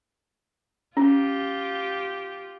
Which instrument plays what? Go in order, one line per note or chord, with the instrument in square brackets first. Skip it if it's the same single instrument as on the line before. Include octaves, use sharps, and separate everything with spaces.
[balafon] C#4 [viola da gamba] F4 G4